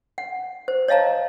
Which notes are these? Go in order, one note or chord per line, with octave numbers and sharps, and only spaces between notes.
F#5
C5
C#5 D#5 F5 A5 A#5